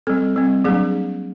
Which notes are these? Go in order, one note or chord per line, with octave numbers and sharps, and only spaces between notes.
G3 C4 A4
G3 C4
F#3 A#3 D4 G#4